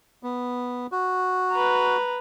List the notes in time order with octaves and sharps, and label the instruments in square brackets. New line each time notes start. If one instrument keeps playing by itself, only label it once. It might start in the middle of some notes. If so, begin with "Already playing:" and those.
[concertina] B3
F#4
[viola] B4 A#5